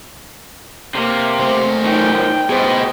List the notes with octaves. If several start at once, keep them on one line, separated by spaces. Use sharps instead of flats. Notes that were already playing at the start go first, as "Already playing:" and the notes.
C3 A#3 C4
A3 C5
F#2 D#3 G5
B2 G#4 C5